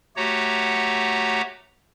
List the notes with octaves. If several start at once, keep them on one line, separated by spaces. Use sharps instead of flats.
A3 F#4 G4 C#5 F#5 A#5